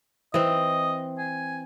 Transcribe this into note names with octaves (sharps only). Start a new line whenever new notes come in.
E3 C4 D#5
G#5